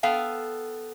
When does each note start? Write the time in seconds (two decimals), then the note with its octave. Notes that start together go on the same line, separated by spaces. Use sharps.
0.03 B3 A4 F5 G5